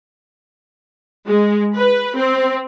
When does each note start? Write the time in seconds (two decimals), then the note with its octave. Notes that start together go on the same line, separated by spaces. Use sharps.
1.27 G#3
1.75 B4
2.14 C4